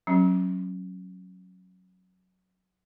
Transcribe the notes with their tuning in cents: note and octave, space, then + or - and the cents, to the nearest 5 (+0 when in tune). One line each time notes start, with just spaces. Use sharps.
F#3 +0 C#4 -25